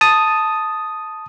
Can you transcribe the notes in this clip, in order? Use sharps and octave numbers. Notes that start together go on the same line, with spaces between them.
A5 D#6